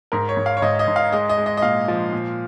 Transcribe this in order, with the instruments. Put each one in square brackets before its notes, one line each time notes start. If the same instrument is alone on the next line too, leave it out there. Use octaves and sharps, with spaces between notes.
[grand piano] G#2 A#4
C#5
G#2
F5
C#5
G#2 D#5
D#5
G#2
F5
G#3 D#5
D#5
G#3
D#5
D#5
A#2 F5
F3
A#2